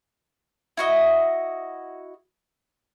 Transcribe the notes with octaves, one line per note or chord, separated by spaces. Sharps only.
E4 F#4 D#5